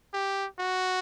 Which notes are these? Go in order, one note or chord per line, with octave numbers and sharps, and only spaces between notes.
G4
F#4